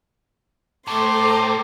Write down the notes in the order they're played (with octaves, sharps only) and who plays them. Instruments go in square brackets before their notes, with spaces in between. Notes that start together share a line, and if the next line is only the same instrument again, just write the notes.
[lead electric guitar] A2 [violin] A3 C6 [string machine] A4 C5 A#5 [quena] D6